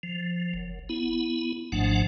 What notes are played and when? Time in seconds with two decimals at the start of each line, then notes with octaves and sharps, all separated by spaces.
0.03 F3
0.54 F#1
0.89 B3 E4
1.72 G#1 G#2 F3 A3 D4 F#5